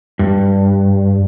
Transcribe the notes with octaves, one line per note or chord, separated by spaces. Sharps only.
G2